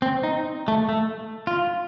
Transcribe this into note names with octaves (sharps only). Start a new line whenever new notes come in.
C4
D#4
A3
A3
F4